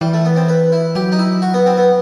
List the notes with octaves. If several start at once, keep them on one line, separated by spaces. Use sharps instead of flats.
E3 G3
A3
B3
C4
B4
E4
F#3 G4
D#4
E4
F#4
B3
C4
B3